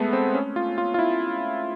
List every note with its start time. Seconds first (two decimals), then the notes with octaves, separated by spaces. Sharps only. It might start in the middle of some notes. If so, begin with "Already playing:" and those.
Already playing: G#3 A3 B3
0.13 C4
0.34 C#4
0.56 F4
0.78 F4
0.94 F4
0.99 E4